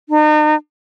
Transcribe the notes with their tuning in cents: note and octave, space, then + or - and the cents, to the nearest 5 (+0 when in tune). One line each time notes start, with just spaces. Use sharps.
D#4 -40